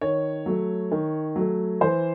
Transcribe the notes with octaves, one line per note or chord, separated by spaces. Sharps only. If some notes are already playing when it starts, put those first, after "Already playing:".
D#3 C#5
F#3 A3
D#3
F#3 A3
E3 C5